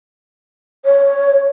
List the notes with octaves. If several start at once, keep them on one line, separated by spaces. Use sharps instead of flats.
C#5